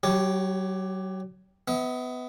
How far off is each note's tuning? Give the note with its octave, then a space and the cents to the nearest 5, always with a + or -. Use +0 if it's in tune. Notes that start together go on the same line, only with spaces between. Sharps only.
F#3 +35 G4 +0 C#5 +0
B3 +20 E5 -35